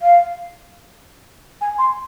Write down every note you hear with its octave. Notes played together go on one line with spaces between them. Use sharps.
F5
G#5
C6